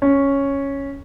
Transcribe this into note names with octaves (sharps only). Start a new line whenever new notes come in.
C#4